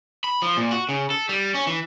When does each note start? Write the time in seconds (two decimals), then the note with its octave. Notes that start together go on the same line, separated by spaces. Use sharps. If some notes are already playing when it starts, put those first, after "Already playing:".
0.24 B5
0.42 F3
0.57 A#2
0.71 F#4
0.89 C#3
1.11 A4
1.29 G3
1.55 C#4
1.67 E3